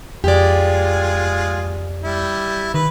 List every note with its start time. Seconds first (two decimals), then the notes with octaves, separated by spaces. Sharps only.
0.24 F2 G#3 F4 G4 G#4 D5
2.03 G3 E4
2.74 D#3 B4